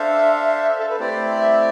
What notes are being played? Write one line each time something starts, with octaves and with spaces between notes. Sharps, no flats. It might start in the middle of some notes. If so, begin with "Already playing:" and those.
Already playing: D4 A4 C5 E5 F5
A4
B4
A3 C4 E4 G4 C5 D5
E5